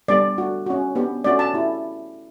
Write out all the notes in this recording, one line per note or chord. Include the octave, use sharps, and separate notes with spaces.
G3 B3 D4 G4 D5
A3 D4 F#4
C#4 F#4
B3 D4 G4
A3 C#4 F#4 D5
A5
A3 E4 G4